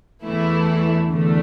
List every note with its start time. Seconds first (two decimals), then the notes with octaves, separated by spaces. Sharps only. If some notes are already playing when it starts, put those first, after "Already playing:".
0.23 E2 E3 A3 E4
1.09 E2 D3 A3